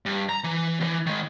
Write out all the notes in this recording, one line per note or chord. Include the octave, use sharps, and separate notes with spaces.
G2
A#5
E3
D#2 E3
D#3 G#3